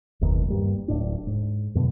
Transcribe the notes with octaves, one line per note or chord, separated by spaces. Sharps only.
F#1 D#2 B2 D#3
G2 G3 A#3
D1 A2 D4
G#2
F#2 B2 D3